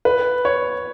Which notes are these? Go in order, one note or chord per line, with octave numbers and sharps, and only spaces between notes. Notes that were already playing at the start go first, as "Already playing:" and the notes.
B4
C#5